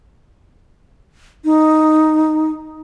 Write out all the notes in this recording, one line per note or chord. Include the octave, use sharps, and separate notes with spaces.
D#4